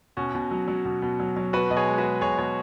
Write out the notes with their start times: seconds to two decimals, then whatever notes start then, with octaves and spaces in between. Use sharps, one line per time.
0.17 B2 C#4 F#4
0.35 B2
0.51 F#3
0.68 F#3
0.85 B2
1.02 B2
1.20 F#3
1.37 F#3
1.53 B2 F#4 B4
1.70 B2 D#5
1.76 G#4 C#5
1.87 G#3
1.98 F#4 B4
2.04 G#3
2.21 B2 G#4 C#5
2.38 B2 G#4 C#5